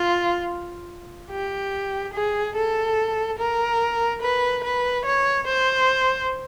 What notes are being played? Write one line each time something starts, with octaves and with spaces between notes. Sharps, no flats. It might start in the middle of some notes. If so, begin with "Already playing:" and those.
Already playing: F4
G4
G#4
A4
A#4
B4
B4
C#5
C5